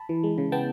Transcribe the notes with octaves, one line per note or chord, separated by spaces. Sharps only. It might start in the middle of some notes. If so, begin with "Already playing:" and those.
Already playing: A5 B5
E3
G#3
C#3
B3 G5 A5